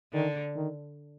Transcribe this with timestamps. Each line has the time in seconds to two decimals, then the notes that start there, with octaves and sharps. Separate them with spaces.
0.13 D3 D#3
0.55 D#3